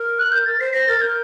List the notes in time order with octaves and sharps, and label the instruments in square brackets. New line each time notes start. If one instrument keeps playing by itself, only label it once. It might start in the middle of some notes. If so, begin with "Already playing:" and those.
Already playing: [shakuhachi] A#4
[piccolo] F#6
G6
A6
[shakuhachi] C5 [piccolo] C7
[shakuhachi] C5 [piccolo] A#6
[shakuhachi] A#4 [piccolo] A6
[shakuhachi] A#4 [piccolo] G6